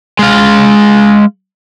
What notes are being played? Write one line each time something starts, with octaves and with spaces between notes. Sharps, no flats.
G#3 F5